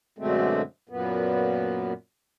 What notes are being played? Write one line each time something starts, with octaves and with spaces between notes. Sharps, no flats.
F#2 B2 D3 G#3 A3 C4
F#2 A#2 B3